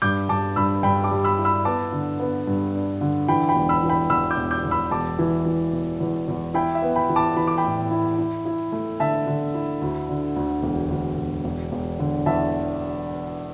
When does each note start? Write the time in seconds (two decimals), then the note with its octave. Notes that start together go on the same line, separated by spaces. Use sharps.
0.02 G2 D6 G6
0.29 G2 A5 D6
0.56 G2 B5 E6
0.83 G2 G5 B5
1.04 A5 D6
1.11 G3
1.24 B5 E6
1.38 E4
1.45 B5 E6
1.65 B3 A5 D6
1.92 D3
2.20 B3
2.47 G2
2.74 D4
3.01 D3
3.28 E3 G5 B5
3.49 G5 B5
3.56 E1
3.69 B5 E6
3.83 E3
3.89 G5 B5
4.10 E2 B5 E6
4.30 D6 G6
4.37 E1
4.51 D6 G6
4.65 E2
4.71 B5 E6
4.91 E1 A5 D6
5.19 E3
5.46 E3
5.73 E1
6.00 E2
6.28 E2
6.54 E4 G5 B5
6.75 E5
6.82 B3
6.96 G5 B5
7.10 E3
7.16 A5 D6
7.36 E3 B5
7.47 D6
7.58 G5 B5
7.64 A2
7.91 E4
8.18 E4
8.46 E4
8.72 A3
9.00 D3 E5 A5
9.27 D3
9.54 E4
9.82 D2
10.09 D3
10.36 D2
10.63 E1
10.90 D2
11.18 E1
11.44 E1
11.72 E1
11.99 D3
12.26 E2 E5 A5